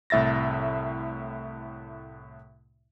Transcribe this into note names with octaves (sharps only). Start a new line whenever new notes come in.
C2 A2 E5 A6 A#6